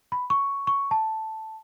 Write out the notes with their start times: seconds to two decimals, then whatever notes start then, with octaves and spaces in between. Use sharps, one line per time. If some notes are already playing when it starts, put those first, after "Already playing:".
0.12 B5
0.30 C#6
0.67 C#6
0.91 A5